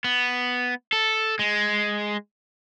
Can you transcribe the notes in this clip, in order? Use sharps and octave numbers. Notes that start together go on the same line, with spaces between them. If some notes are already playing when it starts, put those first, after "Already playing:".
B3
A4
G#3